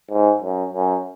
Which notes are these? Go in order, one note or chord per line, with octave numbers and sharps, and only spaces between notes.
G#2
F#2
F#2